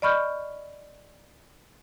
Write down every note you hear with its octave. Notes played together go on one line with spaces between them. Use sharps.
D5 D#5 B5 C#6 F6 G6